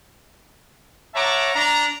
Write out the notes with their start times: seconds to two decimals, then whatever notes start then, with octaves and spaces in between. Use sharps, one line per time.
1.15 C#5 E5 F#5 A5 A#5 D6
1.55 D4 A#5